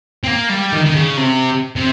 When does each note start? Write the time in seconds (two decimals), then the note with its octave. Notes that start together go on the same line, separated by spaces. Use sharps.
0.24 C4
0.27 A#3
0.50 G3
0.73 D#3
0.86 D#3
0.95 C#3
1.17 C3
1.76 C3